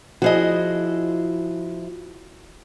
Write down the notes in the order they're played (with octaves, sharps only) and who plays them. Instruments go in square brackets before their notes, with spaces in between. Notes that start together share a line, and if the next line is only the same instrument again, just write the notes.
[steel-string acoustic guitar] F3 E4 [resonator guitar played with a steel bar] F#4 G#4 D#5